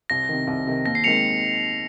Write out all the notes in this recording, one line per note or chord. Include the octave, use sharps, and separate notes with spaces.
C2 A#6
C3 D#3
C2
C3 D#3
D#2 A#6
C7
D#3 G#3 C4 C#7 F7